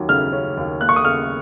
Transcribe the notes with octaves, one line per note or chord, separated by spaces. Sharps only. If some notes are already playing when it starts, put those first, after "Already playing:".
Already playing: D#2 F#3 C#4
C#3 F6
C#4
D#2
A#3 F#6
C#6
D#6
C#3 F6